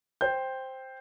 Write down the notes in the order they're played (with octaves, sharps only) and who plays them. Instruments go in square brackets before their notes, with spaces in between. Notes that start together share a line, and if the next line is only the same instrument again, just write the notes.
[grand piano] C5 G5 G6